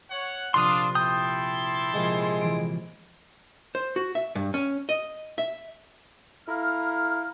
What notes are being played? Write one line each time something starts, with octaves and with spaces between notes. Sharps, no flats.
C#5 F#5
A#1 C3 D4 F4 C6 D#6 E6
E4 G5 A5 C6 D#6
A#1 C3 G#3
E3 D7
C5
F#4
E5
G2
C#4
D#5
E5
A3 E4 F5 A#5 F6